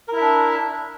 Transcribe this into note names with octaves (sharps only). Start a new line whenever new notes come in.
D4 E4 A#4 E5